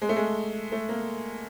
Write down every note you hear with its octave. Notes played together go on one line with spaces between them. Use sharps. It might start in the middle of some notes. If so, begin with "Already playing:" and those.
G#3
A3
G#3
A3
A#3